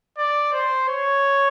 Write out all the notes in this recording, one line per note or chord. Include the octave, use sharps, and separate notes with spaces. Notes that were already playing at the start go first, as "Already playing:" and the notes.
D5
C5
C#5